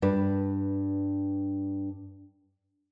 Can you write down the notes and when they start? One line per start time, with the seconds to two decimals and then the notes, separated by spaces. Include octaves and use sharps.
0.02 G2 D4 B4